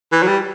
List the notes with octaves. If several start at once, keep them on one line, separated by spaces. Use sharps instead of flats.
E3
F#3
G3